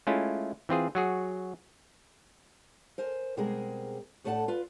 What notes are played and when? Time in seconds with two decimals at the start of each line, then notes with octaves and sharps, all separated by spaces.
0.07 G#3 A3 C#4 E4 F4
0.69 E3 C4 F4 G#4
0.95 F#3 F#4 G#4
2.98 A#4 C5 G#5
3.37 B2 G3 G#3 C4 G#4 A#4
4.24 A2 A3 B3 D4 F#5 A5
4.48 F4 B4